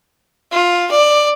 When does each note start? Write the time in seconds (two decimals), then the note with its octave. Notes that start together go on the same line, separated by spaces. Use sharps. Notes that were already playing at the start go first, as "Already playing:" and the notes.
0.52 F4
0.91 D5